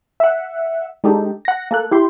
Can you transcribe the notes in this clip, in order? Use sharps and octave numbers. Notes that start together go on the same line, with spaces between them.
E5 F#5
G#3 D4 D#4 G4 A4
F#5 A#6
A#3 A4 F#6
E4 G4 C6